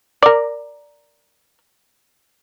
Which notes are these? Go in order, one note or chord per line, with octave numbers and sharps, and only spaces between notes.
A#4 D5